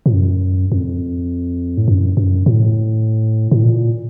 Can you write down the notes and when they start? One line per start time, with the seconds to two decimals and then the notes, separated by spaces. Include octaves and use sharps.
0.06 A2
0.13 F#2
0.72 F2
1.77 A2
1.88 F#2
2.17 F#2
2.46 A2
3.52 A2
3.63 A#2